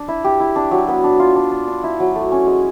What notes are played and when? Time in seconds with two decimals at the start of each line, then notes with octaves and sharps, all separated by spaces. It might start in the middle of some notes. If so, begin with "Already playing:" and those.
Already playing: D4
0.08 E4
0.24 G4
0.40 E4
0.56 D4
0.71 F#3
0.88 B3
1.04 D4
1.20 F4
1.36 D4
1.51 D4
1.68 D4
1.83 E4
2.00 F#3
2.16 A3
2.32 C#4
2.47 G#3